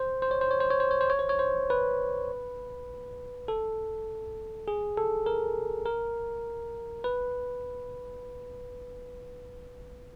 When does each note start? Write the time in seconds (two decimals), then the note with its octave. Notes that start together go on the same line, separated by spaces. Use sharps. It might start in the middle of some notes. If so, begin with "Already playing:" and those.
Already playing: C5
0.22 C5
0.31 C#5
0.41 C5
0.51 C#5
0.60 C5
0.70 C#5
0.80 C5
0.91 C#5
1.01 C5
1.10 C#5
1.19 C5
1.29 C#5
1.39 C5
1.70 B4
3.48 A4
4.68 G#4
4.97 A4
5.26 A#4
5.86 A#4
7.04 B4